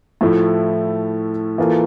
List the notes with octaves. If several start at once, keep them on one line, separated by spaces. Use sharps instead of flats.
A2 F3 A3 E4
E3 A#3 F4 A4